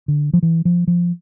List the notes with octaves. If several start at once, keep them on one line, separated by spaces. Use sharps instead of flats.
D3
F3
E3
F3
F3